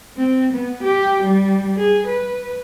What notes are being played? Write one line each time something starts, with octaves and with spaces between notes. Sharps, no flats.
C4
B3
G4
G3
G#4
B4